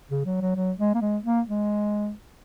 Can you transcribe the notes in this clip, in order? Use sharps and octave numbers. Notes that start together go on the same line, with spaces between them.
C#3
F#3
F#3
F#3
G#3
A#3
G#3
A#3
G#3